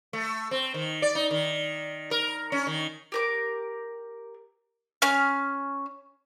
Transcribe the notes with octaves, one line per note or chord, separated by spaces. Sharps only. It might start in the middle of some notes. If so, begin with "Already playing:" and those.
A3
C4
D#3
D5
D#4
D#3
A#4
C#4
D#3
G4 A#4 D6
C#4 F6